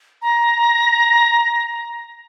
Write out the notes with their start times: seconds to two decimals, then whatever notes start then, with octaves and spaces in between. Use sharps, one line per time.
0.22 A#5